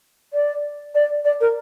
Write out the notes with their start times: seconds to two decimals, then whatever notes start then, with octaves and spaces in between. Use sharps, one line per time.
0.33 D5
0.95 D5
1.25 D5
1.41 A#4